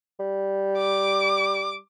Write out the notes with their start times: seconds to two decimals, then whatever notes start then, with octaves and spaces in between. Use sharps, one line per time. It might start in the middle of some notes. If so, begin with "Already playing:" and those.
0.20 G3
0.78 D6